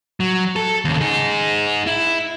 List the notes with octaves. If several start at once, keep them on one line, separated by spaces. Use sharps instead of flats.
F#3
A4
D#2 C#3
D#4 G#4
E4